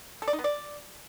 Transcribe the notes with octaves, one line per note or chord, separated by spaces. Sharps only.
A4
D5
D#4
B3
D5